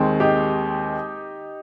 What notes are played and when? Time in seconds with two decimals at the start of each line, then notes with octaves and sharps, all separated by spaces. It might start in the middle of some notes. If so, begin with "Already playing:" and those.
Already playing: D#2 D#3 G#3 C4
0.20 D#4 G4